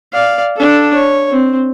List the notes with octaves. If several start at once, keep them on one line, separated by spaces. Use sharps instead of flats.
D5 F5
D4 A4
C#5
C4